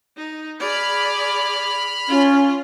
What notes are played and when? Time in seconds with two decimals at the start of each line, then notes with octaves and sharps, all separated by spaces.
0.17 D#4
0.60 G#4 D5 B5 F6
2.09 C#4 F4